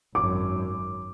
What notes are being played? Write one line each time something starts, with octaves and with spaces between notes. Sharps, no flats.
G#1 F#2 D6